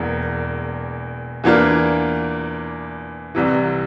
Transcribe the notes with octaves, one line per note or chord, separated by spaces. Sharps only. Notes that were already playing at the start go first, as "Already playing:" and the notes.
Already playing: E1 E2 E3 A#3
E2 E3 A#3 D4 F4
C2 C3 E3